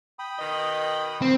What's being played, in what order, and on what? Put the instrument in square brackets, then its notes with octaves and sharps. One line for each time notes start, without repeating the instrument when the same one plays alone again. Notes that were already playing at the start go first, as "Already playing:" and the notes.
[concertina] G5 B5 D#6
[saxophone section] B2 D#3 D#5
[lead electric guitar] C4